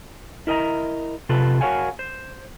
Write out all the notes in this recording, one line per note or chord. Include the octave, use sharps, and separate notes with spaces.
E4 A#4 D#5 G#5 A#5
C3 F4 A4 B4
F#4 A#4 C#5 F5 F#5 G#5
C5